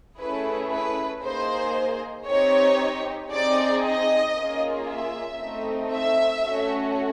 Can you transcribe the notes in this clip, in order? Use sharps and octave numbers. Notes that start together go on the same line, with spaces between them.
A3 C#4 E4 G#4 B4
B4
A#3 D#4 G#4 C5
C4 D#4 G4 C#5
C4 D#4 G#4 D5
D#5
A#3 C#4 F4 G#4
E5
A3 C4 D#4
E5
A3 C#4 F#4